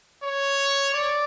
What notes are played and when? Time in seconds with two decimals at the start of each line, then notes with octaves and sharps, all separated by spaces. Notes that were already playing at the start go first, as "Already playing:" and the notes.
0.23 C#5
0.94 D5